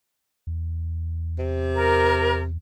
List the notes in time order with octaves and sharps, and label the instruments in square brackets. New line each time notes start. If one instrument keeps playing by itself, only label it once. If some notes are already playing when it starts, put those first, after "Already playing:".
[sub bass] E2
[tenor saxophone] C3
[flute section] A#4